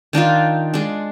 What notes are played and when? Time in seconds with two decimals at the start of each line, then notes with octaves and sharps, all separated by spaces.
0.13 D#3 D4 D#4 F4
0.74 G#3 D4